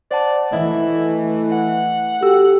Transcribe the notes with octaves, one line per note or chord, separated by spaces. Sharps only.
C5 D5 F#5 A5
E3 A3 E4 D#5
F#5
F#4 G4 A4 E6